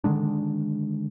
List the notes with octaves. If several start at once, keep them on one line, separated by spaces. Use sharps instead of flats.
D3 D#3 G#3 D4